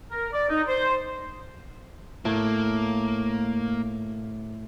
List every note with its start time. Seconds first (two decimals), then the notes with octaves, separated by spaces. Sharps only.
0.11 A#4
0.32 D5
0.50 D#4
0.67 C5
2.25 A2 A#3